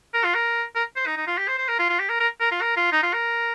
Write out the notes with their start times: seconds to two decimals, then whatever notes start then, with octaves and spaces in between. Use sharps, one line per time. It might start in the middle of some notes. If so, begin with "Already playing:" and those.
0.14 A#4
0.24 F4
0.35 A#4
0.76 A#4
0.96 C5
1.06 D#4
1.17 D#4
1.27 F4
1.38 G4
1.48 C5
1.58 C5
1.69 A#4
1.79 F4
1.90 F4
1.99 G4
2.09 A#4
2.20 A#4
2.41 A#4
2.52 F4
2.62 A#4
2.77 F4
2.92 D#4
3.03 F4
3.13 A#4